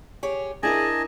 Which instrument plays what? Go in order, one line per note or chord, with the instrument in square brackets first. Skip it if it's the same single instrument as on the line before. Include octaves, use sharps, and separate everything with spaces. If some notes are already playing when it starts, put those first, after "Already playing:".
[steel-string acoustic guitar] G4 G#4 C#5
[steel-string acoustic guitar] D4 E4 A#4 [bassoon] G#4 [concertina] D#5 G#5 A5